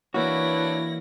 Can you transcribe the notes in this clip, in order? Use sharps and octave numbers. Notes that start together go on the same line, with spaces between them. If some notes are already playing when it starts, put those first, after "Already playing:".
E3 A#3 D4 E4 F#4 B4 C#5 A#6